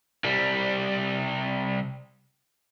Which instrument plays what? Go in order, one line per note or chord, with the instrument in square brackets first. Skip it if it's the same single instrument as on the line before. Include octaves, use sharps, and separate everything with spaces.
[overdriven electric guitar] C2 G3